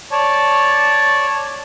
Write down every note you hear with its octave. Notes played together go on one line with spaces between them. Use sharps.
C#5 D5 A5